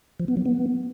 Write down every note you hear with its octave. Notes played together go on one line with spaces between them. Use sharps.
F3
B3
F#3
B3